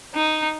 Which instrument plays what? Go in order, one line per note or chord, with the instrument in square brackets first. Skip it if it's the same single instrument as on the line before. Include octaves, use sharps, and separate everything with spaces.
[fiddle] D#4